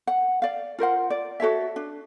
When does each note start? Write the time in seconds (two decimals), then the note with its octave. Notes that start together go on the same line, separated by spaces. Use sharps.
0.07 F#5
0.42 D5 F5
0.79 F4 A#4 C5 F#5
1.10 D5
1.40 F#4 A4 C#5 E5
1.76 D4